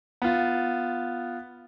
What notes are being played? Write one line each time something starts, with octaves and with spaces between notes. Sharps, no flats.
B3 F4